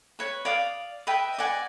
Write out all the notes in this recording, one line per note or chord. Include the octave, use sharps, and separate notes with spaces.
B4 C#5
D5 F5 D#6
B4 D#5 E5 G5
D5 D#5 F#5 G#5